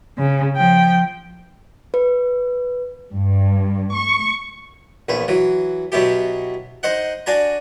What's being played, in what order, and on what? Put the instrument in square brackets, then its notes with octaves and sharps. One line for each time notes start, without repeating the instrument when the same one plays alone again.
[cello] C#3
F3 G5
[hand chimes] B4
[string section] G2
C#6
[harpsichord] A#1 E2 B4
E3 F#3
B2 F#3 B3 E4 G4
D#4 C5 D#5 F#5
D4 F#4 G#5 A#5